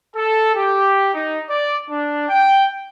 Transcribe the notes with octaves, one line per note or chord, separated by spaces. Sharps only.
A4
G4
D#4
D5
D4
G5